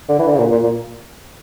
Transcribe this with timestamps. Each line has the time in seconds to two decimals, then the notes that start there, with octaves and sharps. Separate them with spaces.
0.09 D3
0.19 E3
0.28 D3
0.35 C#3
0.39 A#2
0.52 A#2
0.64 A#2